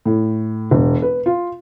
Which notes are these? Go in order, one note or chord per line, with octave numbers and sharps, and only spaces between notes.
A2
E1
B4
F4